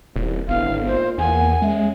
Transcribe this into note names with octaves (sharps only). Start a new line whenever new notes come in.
D#1 C2
G#1 A2 D3 B3 F5
A#2 D#4 C5
E2 A#3 F#5 G#5
G#3 C#4 E5